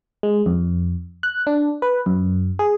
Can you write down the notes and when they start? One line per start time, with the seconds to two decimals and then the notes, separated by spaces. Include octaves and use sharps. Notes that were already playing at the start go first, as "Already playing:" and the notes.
0.23 G#3
0.46 F2
1.23 F#6
1.47 D4
1.82 B4
2.06 F#2
2.59 G#4